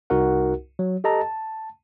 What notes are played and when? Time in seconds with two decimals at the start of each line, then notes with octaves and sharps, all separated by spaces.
0.10 C2 D#4 F#4 A#4 F#5
0.79 F#3
1.04 G4 A4 D#5 A5 A#5
1.21 A5